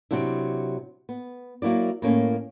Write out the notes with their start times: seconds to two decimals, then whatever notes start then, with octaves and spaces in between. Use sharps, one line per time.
0.11 C3 F#3 D4 E4
1.09 B3
1.62 F#3 A#3 E4 D5
2.02 A2 A#3 C#4